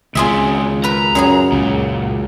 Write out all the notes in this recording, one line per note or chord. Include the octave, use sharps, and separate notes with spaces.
C#2 D#3 C4 F4 G#4 E5
A#4 B4 A#5
F#2 F#3 G#4
C#2 A#2